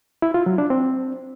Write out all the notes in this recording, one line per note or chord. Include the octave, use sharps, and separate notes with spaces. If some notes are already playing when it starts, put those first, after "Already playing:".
E4
F4
F#3
D4
C4